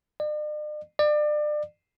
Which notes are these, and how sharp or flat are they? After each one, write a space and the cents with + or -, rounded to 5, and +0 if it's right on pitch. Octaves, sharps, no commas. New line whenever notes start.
D5 +45
D5 +30